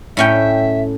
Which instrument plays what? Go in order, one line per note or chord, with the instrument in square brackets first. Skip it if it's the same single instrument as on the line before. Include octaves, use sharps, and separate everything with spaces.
[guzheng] A2 C#4 G5 [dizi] E5